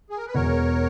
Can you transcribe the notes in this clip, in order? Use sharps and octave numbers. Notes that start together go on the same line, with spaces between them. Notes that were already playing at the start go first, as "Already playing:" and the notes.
G#4
A#4
B4
E1 E2 B2 A#4 C#5